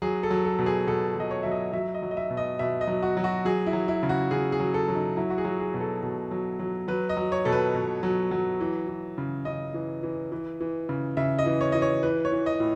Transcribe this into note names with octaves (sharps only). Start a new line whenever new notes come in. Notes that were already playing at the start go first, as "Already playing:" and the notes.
F#3 G#4
A4
F#3
A4
B2
G#4
B2 A4
F#3 D#5
C#5
F#3 E5
D#5
F#3 E5
D#5
F#3
D#5
E5
B2
D#5
B2 E5
D#5
F#3
F#4
F#3
F#4
F#3 G#4
E4
F#3
E4
C#3
F#4
C#3 G#4
G#4
F#3
A4
F#3
D#4
F#3 E4
F#4
G#4
F#3
G#4
B2
A4
B2
F#3
F#3
F#3 B4
D#5
F#3
C#5
B2 A4
B4
B2
F#3
F#3
E3
E3
C#3
C#3 D#5
E3
E3
E3
E3
C#3
C#3 E5
D#5
E3
C#5
E3 D#5
C#5
E3 B4
C#5
E3
D#5
A2